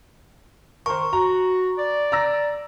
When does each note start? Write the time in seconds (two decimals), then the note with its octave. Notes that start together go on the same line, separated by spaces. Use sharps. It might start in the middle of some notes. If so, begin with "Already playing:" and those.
0.86 D#3 A#4 C5 C#6
1.13 F#4 A#5
1.78 D5
2.12 A#5 E6 A#6